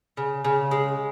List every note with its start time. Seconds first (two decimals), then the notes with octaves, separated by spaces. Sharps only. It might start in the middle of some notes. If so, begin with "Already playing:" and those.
0.17 C#3
0.45 C#3
0.71 G#3